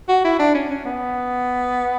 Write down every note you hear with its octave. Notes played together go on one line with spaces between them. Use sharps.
F#4
E4
D4
C#4
C#4
B3